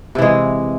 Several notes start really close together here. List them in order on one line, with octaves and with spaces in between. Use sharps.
C3 E3 G#3